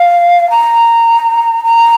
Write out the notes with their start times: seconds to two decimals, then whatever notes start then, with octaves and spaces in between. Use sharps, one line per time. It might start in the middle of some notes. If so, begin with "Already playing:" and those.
Already playing: F5
0.50 A#5
1.65 A#5